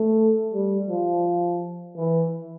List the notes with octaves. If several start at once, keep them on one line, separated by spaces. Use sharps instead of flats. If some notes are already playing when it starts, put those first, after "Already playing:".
Already playing: A3
G3
F3
E3